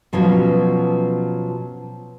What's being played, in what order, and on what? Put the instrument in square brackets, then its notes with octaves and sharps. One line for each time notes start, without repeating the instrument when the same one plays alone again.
[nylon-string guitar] B2 F3 F#3 B3 C#4